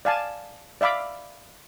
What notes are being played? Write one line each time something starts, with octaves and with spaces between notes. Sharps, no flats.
D5 F5 G#5 A5
D5 E5 F5 B5 D6